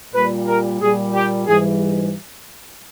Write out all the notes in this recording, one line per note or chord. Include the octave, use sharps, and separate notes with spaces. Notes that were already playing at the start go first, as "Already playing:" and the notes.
A#2 G3 B4
A#4
A#2 G3 G#4
G4
G#2 E3 G3 G#4